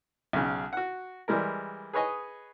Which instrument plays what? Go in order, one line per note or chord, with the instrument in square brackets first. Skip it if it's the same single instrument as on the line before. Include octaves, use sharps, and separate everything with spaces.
[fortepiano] B1 C#3
F#4 F#5
E3 G3 G#3 A#4
G#4 B4 C#5 D#5 G#5